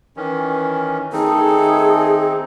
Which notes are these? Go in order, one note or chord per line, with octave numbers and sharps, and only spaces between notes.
D#3 E3 C#4
D#3 A3 C4 D#4 G#4 A4